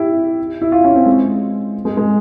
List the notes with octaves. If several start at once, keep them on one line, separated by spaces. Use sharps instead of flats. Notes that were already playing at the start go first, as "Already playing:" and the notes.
Already playing: E4 G4
E4
F4
C#4
C4
G#3
G#3
G#3